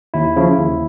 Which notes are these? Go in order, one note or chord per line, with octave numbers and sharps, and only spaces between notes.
D#2 E4
C#3 F3
D#2